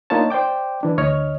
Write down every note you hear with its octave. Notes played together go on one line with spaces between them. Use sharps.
A#3 D4 D#4 F4 C#5 A5
C5 D5 G5 D6
E3 D4
D2 C#5 D#5 F6